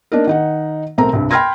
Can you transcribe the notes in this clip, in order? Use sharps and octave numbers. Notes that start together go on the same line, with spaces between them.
A#3 D4 D#4 A#4
D#3 D#4 F#5
B1 A3 C4 A#4 A#5
C2 G2
G5 B5 C6 F6 G#6 A#6